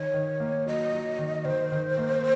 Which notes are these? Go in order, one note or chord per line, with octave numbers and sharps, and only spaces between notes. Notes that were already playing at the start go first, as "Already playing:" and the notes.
Already playing: D#3 C#5
D#3
A#3
F#3 D#5
F#3
D#3
D#3 C5
D#3
A#3